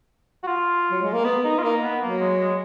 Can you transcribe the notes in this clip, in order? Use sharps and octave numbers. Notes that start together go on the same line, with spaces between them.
F#4
F4
F#3
G#3
A#3
B3
D#4
F4
A#3 D#4
B3
F#3 A#3
G#3
G#3